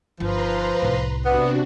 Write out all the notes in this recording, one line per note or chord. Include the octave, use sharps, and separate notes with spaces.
G1 F3 D#4 B4 A#5 C6
C2 A2
C3 B3 D4 F#4